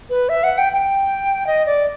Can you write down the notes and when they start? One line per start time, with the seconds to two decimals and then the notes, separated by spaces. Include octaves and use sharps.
0.10 B4
0.29 E5
0.44 F#5
0.58 G5
0.73 G5
1.47 D#5
1.66 D5